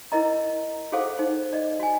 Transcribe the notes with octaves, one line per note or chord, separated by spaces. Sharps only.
E4 A#4 D#5 A#5
F#4 G#4 A4 C5 F5 F#5
D#4 C5
D5 D#5
F#4 G#5